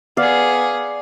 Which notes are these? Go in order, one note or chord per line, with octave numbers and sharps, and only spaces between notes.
B3 G#4 D5 F5